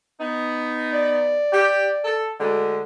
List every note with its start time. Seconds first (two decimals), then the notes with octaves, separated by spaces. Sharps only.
0.19 B3 D#4
0.93 D5
1.52 G4
2.04 A4
2.40 D2 D3 G#3